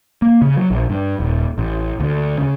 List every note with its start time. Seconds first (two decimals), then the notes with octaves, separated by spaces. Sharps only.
0.22 A#3
0.42 C#3
0.57 F#3
0.70 A#1
0.90 G2
1.20 D#1
1.58 A1
2.00 D2
2.37 C#3